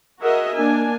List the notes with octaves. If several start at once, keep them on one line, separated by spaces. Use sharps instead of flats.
F#4 G#4 A#4 D#5 E5 F#5
A#3 D4 G#5